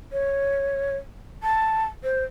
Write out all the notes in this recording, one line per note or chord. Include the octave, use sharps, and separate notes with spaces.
C#5
A5
C5